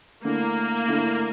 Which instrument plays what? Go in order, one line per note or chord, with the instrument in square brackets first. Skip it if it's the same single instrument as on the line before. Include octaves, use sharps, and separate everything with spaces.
[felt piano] D3 A3 E4 [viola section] A#3
[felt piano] D3 A3 E4